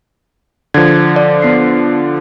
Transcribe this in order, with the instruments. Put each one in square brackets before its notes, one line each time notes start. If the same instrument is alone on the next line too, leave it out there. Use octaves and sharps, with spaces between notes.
[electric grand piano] D3 F3 [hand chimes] G#6
[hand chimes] D5
B3 C7